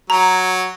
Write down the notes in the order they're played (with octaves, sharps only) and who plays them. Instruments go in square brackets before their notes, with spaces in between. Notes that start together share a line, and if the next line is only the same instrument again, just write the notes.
[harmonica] F#3 [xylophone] A#5